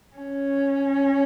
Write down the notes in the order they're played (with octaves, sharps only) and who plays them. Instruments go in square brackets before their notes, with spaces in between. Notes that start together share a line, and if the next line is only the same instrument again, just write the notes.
[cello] C#4